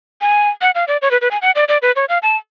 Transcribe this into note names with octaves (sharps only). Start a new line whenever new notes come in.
G#5
F#5
F5
D5
C#5
B4
B4
G#5
F#5
D5
D5
B4
C#5
F5
A5